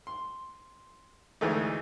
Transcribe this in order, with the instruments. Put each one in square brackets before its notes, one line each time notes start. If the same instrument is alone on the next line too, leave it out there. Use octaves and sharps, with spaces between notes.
[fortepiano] C6
D2 E3 G#3 A3 D#4